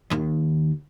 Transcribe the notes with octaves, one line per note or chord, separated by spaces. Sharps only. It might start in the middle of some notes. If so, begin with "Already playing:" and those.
D#2 D#3